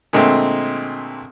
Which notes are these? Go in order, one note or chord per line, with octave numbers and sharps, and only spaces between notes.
A#2 D3 G#3 A3 C4